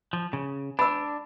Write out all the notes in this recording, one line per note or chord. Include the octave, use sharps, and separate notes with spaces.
F3
C#3
D4 B5 E6